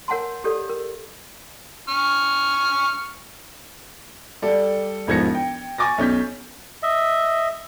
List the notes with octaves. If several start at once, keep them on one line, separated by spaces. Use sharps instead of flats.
A#4 C#5 F#5 G#5 A5 C6
G4 A4 C#5 D5
A#4
C#6 F6
G3 A4 D5
E1 G#2 F3 G#6 A#6 C#7
G5
G#5 C#6 D6 A6 A#6
B1 C#4 G6 B6
D#5 E5